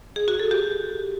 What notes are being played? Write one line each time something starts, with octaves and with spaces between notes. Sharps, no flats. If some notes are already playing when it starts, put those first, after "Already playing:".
G#4
F#4
A4
G4